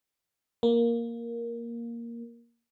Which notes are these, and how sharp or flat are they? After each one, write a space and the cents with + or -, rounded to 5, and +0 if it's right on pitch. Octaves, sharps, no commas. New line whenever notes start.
A#3 +5